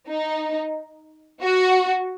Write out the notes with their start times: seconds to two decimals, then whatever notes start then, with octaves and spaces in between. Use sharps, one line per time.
0.09 D#4
1.43 F#4